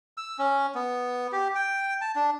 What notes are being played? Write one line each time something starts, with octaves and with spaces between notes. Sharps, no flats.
E6
C#4
B3
G4
G5
A5
D4